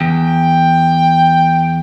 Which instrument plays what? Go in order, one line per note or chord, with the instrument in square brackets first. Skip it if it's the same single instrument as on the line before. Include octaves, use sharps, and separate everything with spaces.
[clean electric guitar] E2 [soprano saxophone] G5